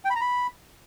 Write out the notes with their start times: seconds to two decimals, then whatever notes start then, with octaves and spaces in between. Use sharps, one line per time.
0.05 G5
0.10 B5
0.15 A#5
0.21 B5